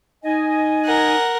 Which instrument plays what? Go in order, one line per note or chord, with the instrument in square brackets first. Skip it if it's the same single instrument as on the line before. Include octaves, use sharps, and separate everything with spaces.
[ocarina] D#4 [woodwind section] D#5 G#5
[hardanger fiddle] A#4 F#5